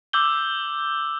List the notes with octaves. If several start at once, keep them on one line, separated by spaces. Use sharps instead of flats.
D6 E6 G6 F#7 G7